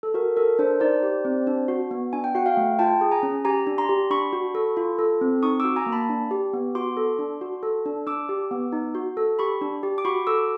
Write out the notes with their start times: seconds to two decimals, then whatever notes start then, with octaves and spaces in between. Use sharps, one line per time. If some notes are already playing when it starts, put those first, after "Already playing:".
0.03 A4
0.14 F#4 A#4
0.36 A4 A#4
0.59 D4 A#4 C5
0.80 D#4 C5 D5
1.03 G4
1.25 C4
1.47 D4
1.68 F#4
1.91 B3
2.13 D4 G#5
2.24 G5
2.35 F#4 F#5
2.46 F5 G5
2.57 A3
2.79 F4 G5 A5
3.01 G#4
3.12 G#5 A#5
3.23 C#4
3.45 G4 G#5 A#5
3.67 D4
3.78 A#5 C6
3.89 G4
4.11 D4 B5 C#6
4.33 F#4
4.55 A4
4.77 F4
4.99 A4
5.21 C4
5.43 D#4 C#6 D#6
5.60 F#4 D6 E6
5.76 G#5 A#5
5.86 A#3
5.92 A5 B5
6.09 D4
6.31 G4
6.53 B3
6.75 F#4 C6 D6
6.97 A4
7.19 D4
7.41 F#4
7.63 A4
7.86 D4
8.07 D4 D6 E6
8.29 G4
8.51 B3
8.72 D#4
8.95 F#4
9.17 A4
9.39 G4 B5 C#6
9.61 D4
9.83 G4
9.98 D6
10.05 F#4 B5 C#6
10.27 A4 D6 E6